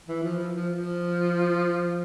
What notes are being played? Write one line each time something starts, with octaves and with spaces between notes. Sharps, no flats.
E3
F3
F3
F3
F3